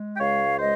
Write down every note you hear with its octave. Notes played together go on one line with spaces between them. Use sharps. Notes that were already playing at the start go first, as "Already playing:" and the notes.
Already playing: G#3
G5
C#2 C#5 F5
G#3 C5 D#5